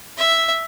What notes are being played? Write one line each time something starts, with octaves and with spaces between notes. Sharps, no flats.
E5